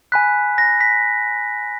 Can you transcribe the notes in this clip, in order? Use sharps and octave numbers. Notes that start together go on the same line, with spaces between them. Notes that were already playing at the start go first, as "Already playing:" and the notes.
G#5 B5 F#6 B6
A#6
B6